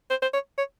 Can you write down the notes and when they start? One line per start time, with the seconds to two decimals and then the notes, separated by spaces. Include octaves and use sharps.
0.10 C5
0.22 C5
0.34 C#5
0.58 C#5